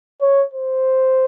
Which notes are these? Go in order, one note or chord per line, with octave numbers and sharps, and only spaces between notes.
C#5
C5